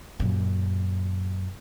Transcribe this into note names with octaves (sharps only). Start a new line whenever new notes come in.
F#2 A#2